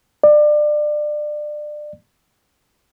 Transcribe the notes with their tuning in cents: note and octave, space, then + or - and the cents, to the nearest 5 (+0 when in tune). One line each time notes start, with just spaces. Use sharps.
D5 +25